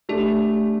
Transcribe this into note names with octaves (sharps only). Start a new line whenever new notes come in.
A3 D4 G4 A4